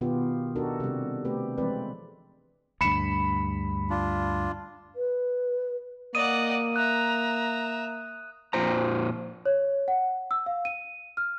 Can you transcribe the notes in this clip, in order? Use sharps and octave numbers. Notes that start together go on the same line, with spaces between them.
B2 D#3 B3 F4 G4
D4 D#4 F#4 G4 A4 A#4
C3 G3
A3 C4 G4 B4
E3 F3 G#3 C4 B4 D5
D2 G2 B5 C#7 E7
D4 F4
B4
A#3 D5 D#5 F#5 D#6 D#7
E5 A#5 F#6
F2 A#2 C5 A#5
C#5
F#5
E6
F5
D#7
F6